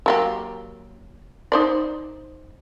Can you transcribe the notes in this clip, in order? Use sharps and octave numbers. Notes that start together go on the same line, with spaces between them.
F#3 A#3 G4
D#4 C5 D5